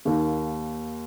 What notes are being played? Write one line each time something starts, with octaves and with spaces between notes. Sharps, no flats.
D#2 D#3 A#3